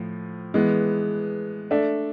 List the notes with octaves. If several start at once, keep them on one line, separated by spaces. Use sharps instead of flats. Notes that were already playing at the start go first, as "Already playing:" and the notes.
Already playing: A2 F3
E3 G#3 B3
A3 D4 A4 E5